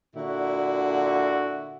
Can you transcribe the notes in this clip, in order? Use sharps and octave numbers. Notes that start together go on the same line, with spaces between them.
A#2 D3 E4 F#4